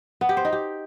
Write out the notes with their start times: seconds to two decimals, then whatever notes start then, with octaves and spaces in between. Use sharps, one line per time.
0.21 B3
0.29 G4
0.37 C5
0.45 D#4
0.52 G4